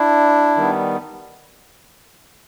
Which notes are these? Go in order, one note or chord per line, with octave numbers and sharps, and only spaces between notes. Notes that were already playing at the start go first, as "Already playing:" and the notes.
Already playing: D4 E4
D#3 G3 B3